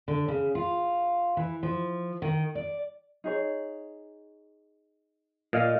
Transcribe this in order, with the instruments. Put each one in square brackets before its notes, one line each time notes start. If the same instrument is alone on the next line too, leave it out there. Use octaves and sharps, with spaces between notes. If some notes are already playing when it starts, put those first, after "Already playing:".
[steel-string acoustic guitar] D3
C#3
F4
E3
F3
D#3
D5
[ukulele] D#4 G#4 C#5
[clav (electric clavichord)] A#2 [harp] D#5 F5